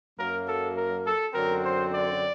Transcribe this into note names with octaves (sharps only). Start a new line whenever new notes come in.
F#2 F#3 A#3 A#4
A4
A#4
A4
F#2 D3 F#3 C4 A#4
C5
D5